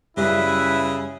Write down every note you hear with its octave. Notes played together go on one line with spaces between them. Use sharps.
F#2 C#3 G3 E4 B4 E5